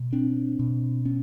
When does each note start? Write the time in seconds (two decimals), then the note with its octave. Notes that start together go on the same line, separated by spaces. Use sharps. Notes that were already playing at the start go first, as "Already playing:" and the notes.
Already playing: B2
0.13 C4 D4
0.59 B2
1.05 B3 C#4